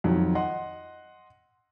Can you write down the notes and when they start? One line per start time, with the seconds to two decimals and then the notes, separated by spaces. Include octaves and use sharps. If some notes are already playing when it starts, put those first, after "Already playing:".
0.04 F2 D#3 F#3
0.35 D#5 F#5 C6